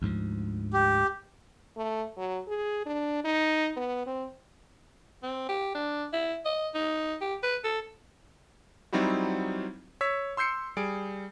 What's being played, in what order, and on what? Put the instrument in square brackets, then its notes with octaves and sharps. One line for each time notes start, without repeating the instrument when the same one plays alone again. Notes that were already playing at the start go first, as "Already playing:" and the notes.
[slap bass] D2 G#2 F3
[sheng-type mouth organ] G4
[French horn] A3
F#3
G#4
D4
D#4
B3
C4
[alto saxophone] C4
G4
D4
E4
D#5
D#4
G4
B4
A4
[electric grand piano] F#3 G3 C4 D#4 E4 F#4
C#5 E6 B6
C6 E6 G6 C7 C#7
G3 G#4 D7